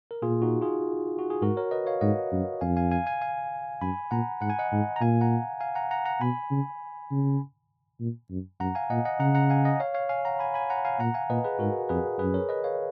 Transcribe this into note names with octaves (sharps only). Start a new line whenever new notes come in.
A#4
A#2 F4 G#4
D#4 F#4
F4 G#4
F#4
G#4
G#2 F#4 A#4
A#4 C#5
B4 D#5
C#5 F5
G#2 D#5 F#5
F#2
F2 F5 G#5
F5 G#5
F5 G#5
F5 G#5
F5 G#5
F#2 G#5 B5
A#2 F#5 A#5
G#2 F#5
G#5
D#5 F#5
G#2
A#5
A#2 F5 G#5
F#5 A#5
F5 G#5
F#5 A#5
F#5 A#5
F#5 A#5
B2 G#5 B5
C#3
C#3
A#2
F#2
F#2 F#5 A#5
F5 G#5
A#2 D#5 F#5
D#5 F#5
C#3 F#5 A#5
F#5 A#5
F5 G#5
D#5 F#5
C#5 F5
C#5 F5
F5 G#5
F#5 A#5
G#5 B5
G#5 B5
F#5 A#5
F5 G#5
A#2 F#5 A#5
F5 G#5
A#2 B4 D#5
G#4 B4
G#2 F#4 A#4
F2 G#4 B4
F#2 G#4 B4
A#4 C#5
B4 D#5
C#5 F5